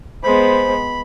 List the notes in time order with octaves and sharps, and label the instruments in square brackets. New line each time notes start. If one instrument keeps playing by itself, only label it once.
[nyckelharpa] G#3 B3 [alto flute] C5 [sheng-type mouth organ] B5